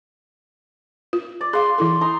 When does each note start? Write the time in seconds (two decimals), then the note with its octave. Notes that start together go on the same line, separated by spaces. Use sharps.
1.13 F4
1.41 D5
1.53 G#4 F5 C6
1.78 E3 E4 A4
2.01 D#4 A#5 C6